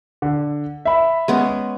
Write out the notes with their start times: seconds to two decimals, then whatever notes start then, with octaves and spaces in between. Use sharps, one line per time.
0.22 D3
0.85 E5 B5
1.28 G#3 B3 C#4